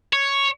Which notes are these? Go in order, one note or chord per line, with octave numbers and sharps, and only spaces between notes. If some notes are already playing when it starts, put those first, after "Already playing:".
C#5